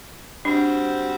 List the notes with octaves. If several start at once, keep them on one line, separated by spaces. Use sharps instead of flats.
G3 C4 D4 F#4 C5